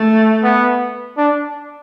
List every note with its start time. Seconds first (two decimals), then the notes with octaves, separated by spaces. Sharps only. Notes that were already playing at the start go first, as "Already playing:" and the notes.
Already playing: A3
0.43 B3
1.17 D4